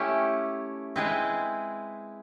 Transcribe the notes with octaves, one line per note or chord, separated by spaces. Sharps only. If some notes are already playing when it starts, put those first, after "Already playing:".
Already playing: A3 C#4 E4 G4
G#3 C4 E4 G#4 B4